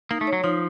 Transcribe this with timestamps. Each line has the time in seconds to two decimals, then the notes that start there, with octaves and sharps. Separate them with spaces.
0.11 A#3 D#4
0.21 A3
0.27 C#5
0.33 F#3
0.44 F3 D#4